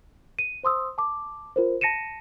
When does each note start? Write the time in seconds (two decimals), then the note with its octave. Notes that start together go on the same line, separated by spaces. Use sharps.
0.39 D#7
0.63 C5 C6 D#6 E6
0.98 A5 D6
1.56 F4 A#4 C5
1.81 A5 A#6 C#7 D#7 E7